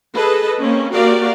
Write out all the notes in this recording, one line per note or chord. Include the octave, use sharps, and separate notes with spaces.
G#4 A4 B4 D#5 A5
A#3 C4 C#4
A#3 F#4 G4 A#4 D5 F5